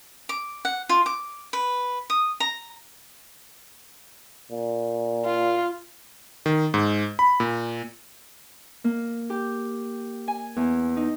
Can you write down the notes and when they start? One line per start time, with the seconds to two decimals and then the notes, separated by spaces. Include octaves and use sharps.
0.29 D6
0.65 F#5
0.89 F4
1.06 D6
1.53 B4
2.10 D#6
2.40 A#5
4.52 A#2
5.25 F4
6.46 D#3
6.74 G#2
7.19 B5
7.40 A#2
8.84 A#3
9.30 G4
10.28 G#5
10.56 E2
10.97 D#4